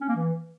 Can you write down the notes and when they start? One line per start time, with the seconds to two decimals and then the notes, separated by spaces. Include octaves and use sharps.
0.01 C#4
0.08 A#3
0.16 E3